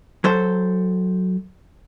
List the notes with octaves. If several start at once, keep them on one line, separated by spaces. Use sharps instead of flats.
F#3 A4 C5